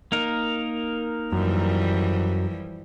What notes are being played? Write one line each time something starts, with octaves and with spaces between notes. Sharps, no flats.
A#3 D#4 A#4
F#2 E3 F3 G3